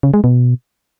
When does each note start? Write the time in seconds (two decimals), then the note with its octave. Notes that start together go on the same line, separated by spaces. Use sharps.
0.03 C#3
0.14 G#3
0.24 B2